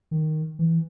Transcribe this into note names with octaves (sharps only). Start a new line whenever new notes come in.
D#3
E3